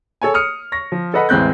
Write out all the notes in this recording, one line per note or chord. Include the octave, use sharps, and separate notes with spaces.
G#4 A4 C#5 G#5
D#6 F6 C#7
C#6 A#6
F3
A4 B4 D#5 F#5 B5
A1 E2 G#3 C4 F#6 G6